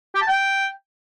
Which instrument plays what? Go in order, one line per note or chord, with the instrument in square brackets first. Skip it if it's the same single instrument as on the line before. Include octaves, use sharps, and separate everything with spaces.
[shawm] G4
A5
G5